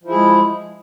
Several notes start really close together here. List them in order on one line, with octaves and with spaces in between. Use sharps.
F3 E4 G#4 G#3